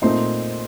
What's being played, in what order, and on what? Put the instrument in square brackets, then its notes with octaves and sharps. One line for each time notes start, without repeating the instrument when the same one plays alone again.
[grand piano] A#2 A3 C4 D#4 C6